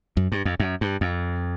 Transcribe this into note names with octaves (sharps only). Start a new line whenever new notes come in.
F#2
G2
F2
F#2
G2
F2